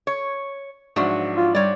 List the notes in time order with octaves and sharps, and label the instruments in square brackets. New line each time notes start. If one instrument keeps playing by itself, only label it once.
[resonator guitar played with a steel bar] C#5
[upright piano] G#2 D4 E5 [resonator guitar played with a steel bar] F3 F#3 F#4
[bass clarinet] F4
[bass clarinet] G3 [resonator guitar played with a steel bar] C#5 D5